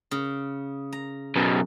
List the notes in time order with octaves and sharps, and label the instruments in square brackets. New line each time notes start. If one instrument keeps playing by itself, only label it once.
[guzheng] C#3
A#5
[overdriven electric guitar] F#2 B2